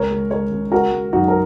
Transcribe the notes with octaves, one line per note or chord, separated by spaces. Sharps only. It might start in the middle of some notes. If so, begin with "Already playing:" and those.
Already playing: C#2 A#4 C#5
G#3
G#3 A#4 C#5
C#3
G#3 F#4 A#4
G#3
F#2 D#4 F#4
A#4